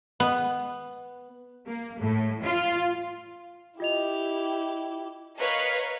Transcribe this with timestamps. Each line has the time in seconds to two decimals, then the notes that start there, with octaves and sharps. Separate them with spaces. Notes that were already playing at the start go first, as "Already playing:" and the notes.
0.20 B3
1.66 A#3
1.99 A2
2.43 F4
3.80 E4 F4 G4 D#5 F7
5.37 A#4 B4 C#5 D#5 F5